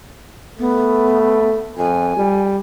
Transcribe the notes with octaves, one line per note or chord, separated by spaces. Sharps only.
A3 B3
F2 G#5
G3